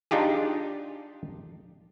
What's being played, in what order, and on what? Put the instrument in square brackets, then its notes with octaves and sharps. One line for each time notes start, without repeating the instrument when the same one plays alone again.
[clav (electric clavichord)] D4 D#4 F4 G4 G#4